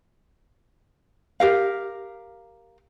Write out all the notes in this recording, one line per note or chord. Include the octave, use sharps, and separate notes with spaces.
G4 A#4 F5